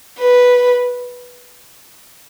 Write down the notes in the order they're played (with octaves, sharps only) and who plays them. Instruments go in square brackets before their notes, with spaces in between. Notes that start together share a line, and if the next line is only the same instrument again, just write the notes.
[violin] B4